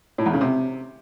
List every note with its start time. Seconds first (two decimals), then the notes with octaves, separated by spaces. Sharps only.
0.18 A2
0.26 E2
0.33 C#3
0.41 C3